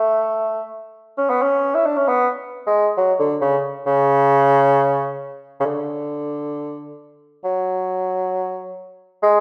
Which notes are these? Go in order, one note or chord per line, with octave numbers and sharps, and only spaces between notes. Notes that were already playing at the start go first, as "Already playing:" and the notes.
Already playing: A3
C#4
B3
C#4
E4
D4
C#4
B3
G#3
F#3
D3
C#3
C#3
C#3
D3
F#3
G#3